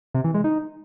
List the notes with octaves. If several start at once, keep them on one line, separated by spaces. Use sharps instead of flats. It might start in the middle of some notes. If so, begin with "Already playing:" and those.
C3
E3
G#3
D#4